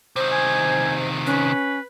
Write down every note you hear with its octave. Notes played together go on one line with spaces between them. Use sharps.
C3 D#3 C5
G#5
C#4 B4